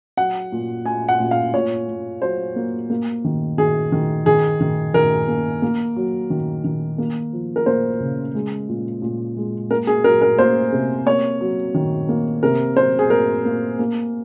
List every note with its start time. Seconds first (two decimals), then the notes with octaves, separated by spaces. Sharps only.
0.17 F#3 F#5
0.52 A#2
0.85 A#2 G#5
1.08 F#5
1.20 A#2
1.31 F5
1.54 A#2 C#5
1.88 A#2
2.22 F#3 C5
2.56 A#3
2.90 A#3
3.25 D#3
3.58 D#3 G#4
3.92 D#3
4.26 D#3 G#4
4.60 D#3
4.94 D#3 A#4
5.28 A#3
5.62 A#3
5.96 F#3
6.30 D#3
6.64 D#3
6.98 A#3
7.33 F3
7.56 A#4
7.66 A#3 C5
8.00 C#3
8.35 G#3
8.69 A#2
9.02 A#2
9.37 G#3
9.70 A#3 A#4
9.87 G#4
10.04 F#3 A#4
10.22 A#4
10.39 A#3 C5
10.72 C3
11.06 A#3 C#5
11.41 F#3
11.74 D#3
12.09 A#3
12.43 C3 A#4
12.77 F#3 C5
12.99 G#4
13.10 A#3 A#4
13.45 A#3
13.79 A#3